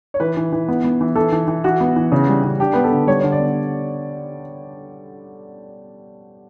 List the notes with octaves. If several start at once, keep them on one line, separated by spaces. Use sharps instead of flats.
C#5
E3 B4
E3
E3
B3
B3
E3
E3 A4
E3
E3
E3 F#4
B3
E3
C#3
G3
C#3
D4 G4
B3 B4
A4
D3
G3 C#5
D3 C#5
D5
B3